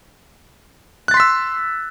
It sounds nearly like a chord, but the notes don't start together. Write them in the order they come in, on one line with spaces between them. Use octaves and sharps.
F#6 A6 C6 B6 E6